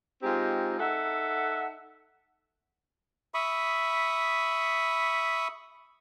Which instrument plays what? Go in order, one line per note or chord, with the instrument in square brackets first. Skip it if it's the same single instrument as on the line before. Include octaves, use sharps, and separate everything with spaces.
[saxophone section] G#3 C4 D#4 F4 G4
D#4 A4 E5 F#5
[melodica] E5 B5 C#6 D#6